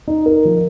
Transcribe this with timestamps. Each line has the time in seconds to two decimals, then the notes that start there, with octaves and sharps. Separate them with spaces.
0.08 D#4
0.26 A#4
0.45 F3